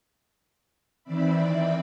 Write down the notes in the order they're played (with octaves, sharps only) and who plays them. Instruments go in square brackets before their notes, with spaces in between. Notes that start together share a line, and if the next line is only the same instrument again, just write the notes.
[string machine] D#3 E3 C4 D5 E5 B5